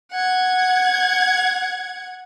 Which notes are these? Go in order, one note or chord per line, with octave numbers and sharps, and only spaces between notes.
F#5 G#6